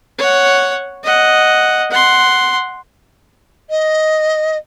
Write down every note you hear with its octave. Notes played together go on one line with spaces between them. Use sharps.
C#5 F#5
D#5 F#5
F#5 C6
D#5